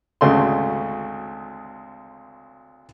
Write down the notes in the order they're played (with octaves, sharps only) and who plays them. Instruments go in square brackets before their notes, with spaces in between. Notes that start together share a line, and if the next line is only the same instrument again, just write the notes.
[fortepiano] G#1 D2 C#3 A3 C6